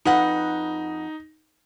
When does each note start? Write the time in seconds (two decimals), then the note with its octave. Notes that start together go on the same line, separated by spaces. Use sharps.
0.05 F2 D#4 B4 F#5